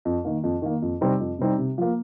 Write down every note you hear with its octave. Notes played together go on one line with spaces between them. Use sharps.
F2
D#3 A#3
F2
D#3 A#3
F2
C3 G3 C4 D#4
F2
C3 G3 C4 D#4
C3
F3 A#3